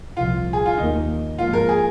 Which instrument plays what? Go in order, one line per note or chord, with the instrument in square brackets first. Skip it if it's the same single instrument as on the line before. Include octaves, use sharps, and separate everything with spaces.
[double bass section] C2 A#2 F3 [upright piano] F4
[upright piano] G#4
F4
[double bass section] D#2 D#3 A#3 [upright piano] D#4
[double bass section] G#1 G#2 F3 A#3 [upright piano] F4
[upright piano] A#4
G#4